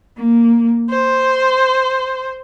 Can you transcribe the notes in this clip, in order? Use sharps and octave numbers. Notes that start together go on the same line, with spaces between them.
A#3
C5